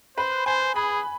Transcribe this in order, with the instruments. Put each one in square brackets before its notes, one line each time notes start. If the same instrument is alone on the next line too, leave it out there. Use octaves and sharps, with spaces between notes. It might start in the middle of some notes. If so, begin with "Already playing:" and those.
[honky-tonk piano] B4 [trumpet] C5
[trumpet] C5 [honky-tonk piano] G#5
[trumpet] G#4 [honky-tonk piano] B5